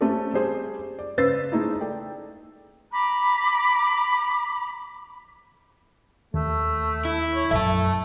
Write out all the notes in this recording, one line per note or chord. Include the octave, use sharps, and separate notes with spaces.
A3 C4 C#4 G4 A4
G3 G#4 C5
D5
C#3 B4 C5 E6 A6 C7
G#3 A3 D#4 E4
A4 D5 G5
A#5 B5 D6
D#2 A3
E4
C#5
A#1 F#2 A4 E5 A5